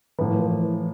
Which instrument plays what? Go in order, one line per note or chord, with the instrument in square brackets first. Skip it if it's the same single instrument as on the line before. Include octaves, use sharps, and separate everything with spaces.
[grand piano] A2 F3 A#3 [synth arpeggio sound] E3